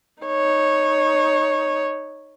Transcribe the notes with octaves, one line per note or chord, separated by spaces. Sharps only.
D#4 C#5